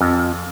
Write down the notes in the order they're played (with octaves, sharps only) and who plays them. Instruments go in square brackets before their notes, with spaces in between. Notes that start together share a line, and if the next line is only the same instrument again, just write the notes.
[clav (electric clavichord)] F2